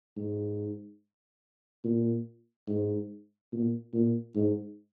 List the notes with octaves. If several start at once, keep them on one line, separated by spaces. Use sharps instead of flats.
G#2
A#2
G#2
A#2
A#2
G#2